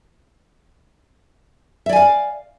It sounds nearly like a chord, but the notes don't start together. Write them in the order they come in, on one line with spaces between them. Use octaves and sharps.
E5 D5 G#5 F5